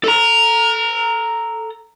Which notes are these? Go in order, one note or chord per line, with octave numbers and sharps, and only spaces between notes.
A4 A#5